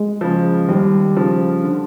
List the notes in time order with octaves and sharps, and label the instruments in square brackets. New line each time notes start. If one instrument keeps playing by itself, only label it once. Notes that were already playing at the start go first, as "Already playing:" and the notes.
Already playing: [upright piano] G#3
[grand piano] C#3 F3
[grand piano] D#2 [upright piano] G3
[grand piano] C#3 F3
D3